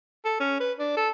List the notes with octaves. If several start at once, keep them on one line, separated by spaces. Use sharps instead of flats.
A4
C#4
B4
D4
A4